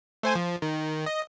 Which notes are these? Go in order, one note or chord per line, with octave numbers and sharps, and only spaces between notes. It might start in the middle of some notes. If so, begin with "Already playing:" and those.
A3 C5 G#5
F3
D#3
D#5